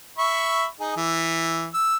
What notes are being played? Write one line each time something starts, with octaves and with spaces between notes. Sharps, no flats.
E5 B5 C#6
D#4 G#4
E3
E6